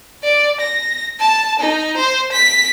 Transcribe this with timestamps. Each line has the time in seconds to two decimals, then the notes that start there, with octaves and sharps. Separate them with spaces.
0.24 D5
0.60 A#6
1.20 A5
1.59 D#4
1.97 C5
2.32 B6